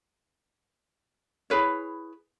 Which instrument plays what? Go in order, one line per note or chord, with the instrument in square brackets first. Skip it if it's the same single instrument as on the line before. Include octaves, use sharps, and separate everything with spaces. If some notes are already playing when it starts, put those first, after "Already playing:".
[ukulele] E4 G#4 B4 C#5